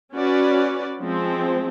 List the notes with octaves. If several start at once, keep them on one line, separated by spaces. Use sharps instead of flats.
C#4 F#4 B4 D5
F3 G#3 C4